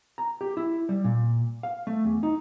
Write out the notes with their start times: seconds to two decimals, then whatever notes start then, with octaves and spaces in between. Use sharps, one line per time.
0.18 A#5
0.41 G4
0.57 E4
0.89 G3
1.04 A#2
1.63 F5
1.87 A3
2.05 E2
2.23 D#4